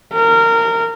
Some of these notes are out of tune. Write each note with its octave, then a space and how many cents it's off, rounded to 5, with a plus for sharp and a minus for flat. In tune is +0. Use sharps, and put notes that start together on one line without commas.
A#4 -20